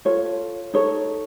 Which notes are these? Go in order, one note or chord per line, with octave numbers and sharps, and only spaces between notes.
F4 A4 C#5
D#4 A4 C#5